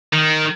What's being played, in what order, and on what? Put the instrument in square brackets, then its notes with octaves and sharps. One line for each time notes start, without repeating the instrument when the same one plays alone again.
[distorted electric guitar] D#3